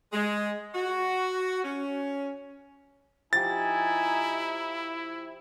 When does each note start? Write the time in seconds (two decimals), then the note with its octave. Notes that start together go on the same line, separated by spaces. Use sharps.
0.13 G#3
0.74 F#4
1.64 C#4
3.33 F3 D#4 E4 G4 G#5 A6